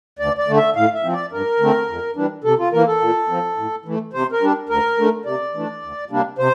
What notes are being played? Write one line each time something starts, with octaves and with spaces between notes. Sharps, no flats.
D2 D5
D5
D3 A3
E5
A2 F5
E5
F3 C4
D5
G2 A#4
D3 A3 C4
F2
E3 G3 D4
C3 A4
F4
E3 A#3 A#4
A4
A#2
F3 C4
A2
E3 A3
C3 C5
A#4
G3 D4
D2 A#4
D3 A3
C3 D5
E3 A3 D4
D2
C3 G3 A#3 D4
C3 C5